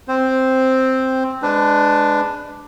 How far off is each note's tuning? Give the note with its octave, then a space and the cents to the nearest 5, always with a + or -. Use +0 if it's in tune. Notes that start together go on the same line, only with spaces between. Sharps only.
C4 +0 C5 +0
G#3 +0 D4 +5 B4 +25